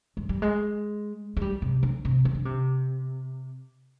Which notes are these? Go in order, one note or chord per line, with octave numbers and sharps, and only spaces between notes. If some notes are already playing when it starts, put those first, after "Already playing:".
G#3
G3
G#3
G#3
G3
C3
D3
C3
C3
D3
C3